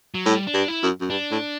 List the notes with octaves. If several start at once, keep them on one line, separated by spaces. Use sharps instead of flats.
F#3
A2 G3
D4
G2
E4
F#2
F#2
G2 D4
A2